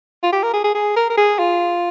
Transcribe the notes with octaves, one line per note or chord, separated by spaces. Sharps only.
F4
G4
A#4
G#4
G#4
G#4
A#4
A#4
G#4
F4